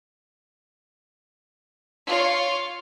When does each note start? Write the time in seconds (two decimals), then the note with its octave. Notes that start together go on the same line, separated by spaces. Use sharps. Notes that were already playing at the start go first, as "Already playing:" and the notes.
2.06 F4 C#5